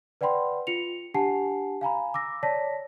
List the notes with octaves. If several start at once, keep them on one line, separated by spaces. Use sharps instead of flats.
B4 D5 F#5 G5 B5 C6
F4 C#7 F7
D4 G4 F#5 G#5 A5 C7
F5 G#5 A#5 B5
D6 E6 A#6
C#5 D5 A5 A#6 B6